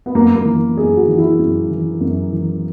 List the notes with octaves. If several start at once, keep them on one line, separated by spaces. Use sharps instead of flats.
B3
F#2 A#3
A#3
E3
F#2 G#4
F#4
E3
E4
F#2
E3
F#2
E3